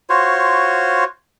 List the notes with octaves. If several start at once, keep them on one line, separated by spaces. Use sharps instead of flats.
F4 F#4 C5 C#5